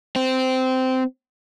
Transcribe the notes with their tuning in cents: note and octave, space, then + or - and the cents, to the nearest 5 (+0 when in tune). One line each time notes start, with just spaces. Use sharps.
C4 -15